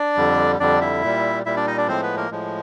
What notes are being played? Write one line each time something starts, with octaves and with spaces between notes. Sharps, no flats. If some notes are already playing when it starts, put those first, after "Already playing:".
Already playing: D4 D5
F2 D3 G3
F2 D3 G3 D4 D5
E4 E5
A#2 G3
A#2 G3 E4 E5
D4 D5
D#4 D#5
D4 D5
A2 F3 G#3 C4 C5
B3 B4
A#3 A#4
A2 F3 G#3